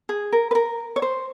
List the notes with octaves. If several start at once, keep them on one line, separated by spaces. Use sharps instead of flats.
G#4
A#4
B4
A#4
C#5
C5